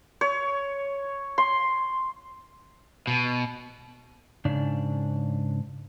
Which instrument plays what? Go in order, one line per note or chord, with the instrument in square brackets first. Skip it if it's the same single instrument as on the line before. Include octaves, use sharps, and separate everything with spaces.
[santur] C#5
C6
[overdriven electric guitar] B2
[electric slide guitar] G#2 C#3 D4 D5